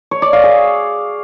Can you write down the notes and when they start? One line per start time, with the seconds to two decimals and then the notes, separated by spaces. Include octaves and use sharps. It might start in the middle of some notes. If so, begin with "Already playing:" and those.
0.11 C#5
0.22 D5
0.33 F5
0.44 G#4